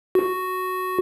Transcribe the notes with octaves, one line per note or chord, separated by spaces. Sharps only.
F#4